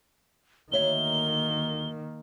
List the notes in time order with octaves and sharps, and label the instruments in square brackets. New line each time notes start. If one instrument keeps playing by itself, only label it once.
[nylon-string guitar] D2 C#5 E5 [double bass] D#3 A#3 [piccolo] G7